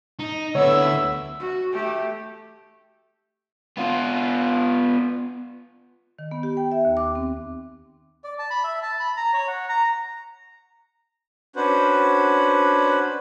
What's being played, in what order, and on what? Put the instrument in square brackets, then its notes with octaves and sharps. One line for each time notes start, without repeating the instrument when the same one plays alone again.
[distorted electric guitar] D#4
[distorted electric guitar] D2 E4 [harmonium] D3 B3 [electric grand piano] C#5 [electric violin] E5 E6
[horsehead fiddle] F#4
A3 G4
[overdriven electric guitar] B3 F4
[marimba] D#3
B3
G4
G5
E5
D#2
D6
C4
[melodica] D5
A5
B5
E5
A5
B5
A#5
C#5
F#5
A#5
[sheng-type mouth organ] C#4 D4 F#4 B4 C5